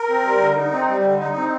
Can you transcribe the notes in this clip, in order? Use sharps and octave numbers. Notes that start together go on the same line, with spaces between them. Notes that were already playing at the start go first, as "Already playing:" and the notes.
Already playing: A#4
C4
G3
D3
D#4
C4
G3
D3
D#4
C4